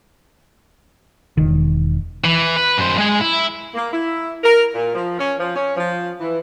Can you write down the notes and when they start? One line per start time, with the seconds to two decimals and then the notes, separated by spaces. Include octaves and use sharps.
1.37 E1 D#3
2.24 E3
2.56 B4
2.78 F#2 C5
2.98 G#3 G#5
3.21 E4
3.74 A#3
3.93 E4
4.44 A#4
4.74 A#2
4.94 F3
5.19 C#4
5.39 F3
5.56 C#4
5.76 F3
6.20 E3